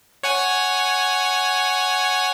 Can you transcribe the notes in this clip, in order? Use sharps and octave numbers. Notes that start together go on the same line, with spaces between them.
C#5 F#5 G#5